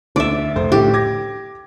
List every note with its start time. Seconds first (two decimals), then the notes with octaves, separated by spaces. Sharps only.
0.16 D2 D5 E5
0.56 F1 C5
0.72 A2 D3 G4
0.94 D6 G#6 A#6